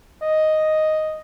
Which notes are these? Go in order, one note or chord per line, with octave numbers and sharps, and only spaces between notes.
D#5